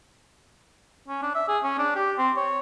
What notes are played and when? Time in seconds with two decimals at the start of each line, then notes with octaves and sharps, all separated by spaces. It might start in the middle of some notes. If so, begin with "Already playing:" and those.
1.08 C#4
1.22 D4
1.35 E5
1.48 G#4
1.63 C#4
1.78 D4
1.95 G4
2.18 C4
2.37 C#5